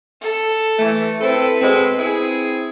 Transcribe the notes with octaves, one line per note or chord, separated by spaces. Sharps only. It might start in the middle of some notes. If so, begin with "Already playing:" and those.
A4
E3 A3
C4 E4 A4 B4
B2 G#3 C4
C4 E4 G#4